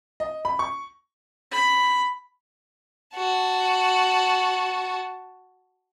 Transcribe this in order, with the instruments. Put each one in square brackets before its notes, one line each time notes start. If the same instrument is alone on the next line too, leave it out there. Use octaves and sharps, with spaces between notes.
[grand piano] D#5
B5
C#6
[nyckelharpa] B5
[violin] F#4 A5